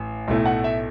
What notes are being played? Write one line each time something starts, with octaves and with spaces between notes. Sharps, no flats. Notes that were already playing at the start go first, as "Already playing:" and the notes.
Already playing: A1
B1 A2 A3
F#5
E5